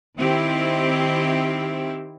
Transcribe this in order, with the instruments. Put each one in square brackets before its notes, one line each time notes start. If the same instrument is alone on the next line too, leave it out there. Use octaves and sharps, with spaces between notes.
[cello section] D#3 C4 E4 G4